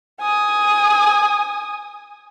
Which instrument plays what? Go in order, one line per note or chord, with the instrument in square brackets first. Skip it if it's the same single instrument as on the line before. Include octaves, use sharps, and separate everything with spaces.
[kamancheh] G#5 D#6